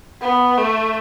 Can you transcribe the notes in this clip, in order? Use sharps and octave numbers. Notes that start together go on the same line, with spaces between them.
B3
A3